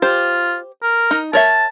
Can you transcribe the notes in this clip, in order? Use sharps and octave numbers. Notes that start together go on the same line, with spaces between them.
F4 G4 C5
A#4
D#4
A#4 C#5 E5 A5